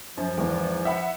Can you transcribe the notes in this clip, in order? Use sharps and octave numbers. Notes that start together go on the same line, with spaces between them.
F#2 F3
G#1 E2
E5 F#5 B5